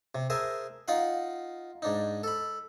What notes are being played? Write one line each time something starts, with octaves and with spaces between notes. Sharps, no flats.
C3
G#4 A#4 C5 E5 G#5 A5
D#4 F4 F5 F#5
G#2 D4 D#4
A4 B5